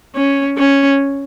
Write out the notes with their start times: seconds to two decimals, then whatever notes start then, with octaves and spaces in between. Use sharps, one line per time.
0.15 C#4
0.58 C#4